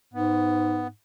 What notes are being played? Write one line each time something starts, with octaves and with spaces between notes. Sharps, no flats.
G#2 B3